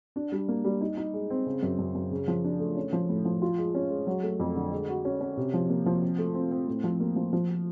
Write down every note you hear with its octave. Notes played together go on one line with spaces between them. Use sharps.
D4
G3
A#3
G3
D#4
D#4
G#3
C4
C#3
F#2
F#2
F#2
C#3
F3
D4
A3
C#4
F3
A2
F3
F4
G#3
C#4
G#3
F#3
A3
F2
D3
G#3
F#4
C#4
C#4
C3
F3
A#3
F3
C4
A3
C4
C4
A2
F3
A#3
F3
F3